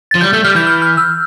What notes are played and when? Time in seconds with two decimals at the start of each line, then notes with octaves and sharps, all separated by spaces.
0.11 F3 A6
0.21 G3 G6
0.33 A3 G6
0.44 G3 F6
0.55 E3 G6
0.67 F6
0.82 F6
0.97 E6